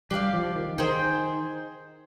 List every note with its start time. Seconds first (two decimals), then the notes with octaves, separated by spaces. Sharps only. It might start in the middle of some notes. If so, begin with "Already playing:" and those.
0.10 G3 D4 G4 D5 F5
0.33 F3
0.55 D#3
0.78 D#3 D#4 G#4 C5 G5